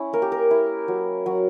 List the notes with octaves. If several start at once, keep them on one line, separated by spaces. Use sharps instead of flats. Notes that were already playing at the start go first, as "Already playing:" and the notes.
Already playing: C#4 E4
A#3 A#4
G4
A#4
E4
F#3
F#3